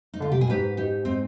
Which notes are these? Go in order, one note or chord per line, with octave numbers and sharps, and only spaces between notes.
D#4
D3 F4
C3 G4
B2 G#4
G#2 G4 B4
D#4 G4
C4 D#4